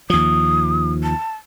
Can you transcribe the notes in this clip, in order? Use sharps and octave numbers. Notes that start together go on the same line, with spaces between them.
D#2 F3 D#6
A5